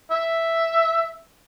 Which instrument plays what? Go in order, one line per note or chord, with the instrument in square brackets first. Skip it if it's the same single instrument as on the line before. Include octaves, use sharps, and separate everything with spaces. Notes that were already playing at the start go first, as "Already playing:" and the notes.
[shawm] E5